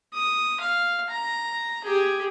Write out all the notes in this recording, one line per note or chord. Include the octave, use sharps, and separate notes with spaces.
D#6
F5
A#5
G4 G#4